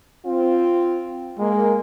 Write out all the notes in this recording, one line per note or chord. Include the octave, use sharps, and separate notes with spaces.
C4 F4
G#3 A#3